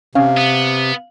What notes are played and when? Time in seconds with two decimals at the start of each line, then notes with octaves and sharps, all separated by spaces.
0.15 C3 C#4 F5
0.37 B3